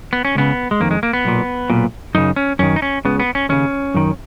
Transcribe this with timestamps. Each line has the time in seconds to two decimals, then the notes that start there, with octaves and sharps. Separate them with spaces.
0.13 B3
0.25 C#4
0.35 C#2 C#3 B3
0.71 G#3
0.80 F2 D#3 A#3
0.91 G#3
1.03 A#3
1.13 B3
1.25 B1 A#2
1.70 B1 A#2
2.15 F#2 C#3 D#4
2.36 C#4
2.59 F#2 D#3 C#4
2.76 D#4
2.82 C#4
3.05 C#2 C#3 B3
3.20 B3
3.35 C#4
3.49 D#2 C#3 C#4
3.94 F#2 D#3